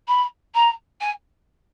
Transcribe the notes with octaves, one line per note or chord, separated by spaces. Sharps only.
B5
A#5
G#5